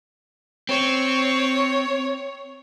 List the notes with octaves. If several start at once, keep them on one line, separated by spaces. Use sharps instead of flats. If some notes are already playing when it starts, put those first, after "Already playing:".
C4 C#5